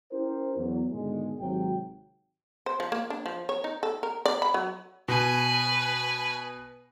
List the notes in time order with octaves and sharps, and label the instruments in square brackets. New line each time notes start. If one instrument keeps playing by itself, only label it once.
[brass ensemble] C#4 E4 G4 A#4 C5
E2 F#3
G#2 B2 D3 D#3 G#3
G#1 C3 F#3 G5
[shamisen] C5
F3
A#3
D4
F3
C#5
D#4
A4
A#4
D5
B5
F#3
[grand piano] B2 [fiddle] B4 G#5